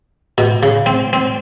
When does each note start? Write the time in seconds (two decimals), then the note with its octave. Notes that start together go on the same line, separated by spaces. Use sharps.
0.38 B2
0.63 C#3
0.86 C4
1.13 C4